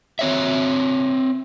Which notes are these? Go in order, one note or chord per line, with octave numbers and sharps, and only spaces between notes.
C4 C#5 E5